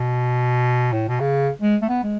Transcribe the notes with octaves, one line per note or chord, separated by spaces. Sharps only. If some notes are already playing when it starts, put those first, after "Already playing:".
Already playing: B2
A2
B2
C#3
G#3
A3
B3
G#3